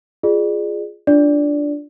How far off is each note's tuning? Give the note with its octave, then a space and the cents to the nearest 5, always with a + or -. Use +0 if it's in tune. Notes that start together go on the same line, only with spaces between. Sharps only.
F4 +0 G#4 +0 D5 +30
D4 +0 F4 -5 D5 -15